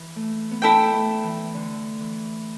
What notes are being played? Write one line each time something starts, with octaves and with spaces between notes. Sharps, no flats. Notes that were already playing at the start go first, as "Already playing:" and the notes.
Already playing: E3
A3
B3
D4 E4 A4 G5
A3
E3
D3
E3